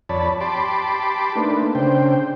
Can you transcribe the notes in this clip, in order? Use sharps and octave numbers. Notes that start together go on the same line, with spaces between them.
F2 C#5 D5 A5 B5
G4 A5 B5 C6 D6
A3 A#3 D4 D#4 B4
C#3 D4 C5 G5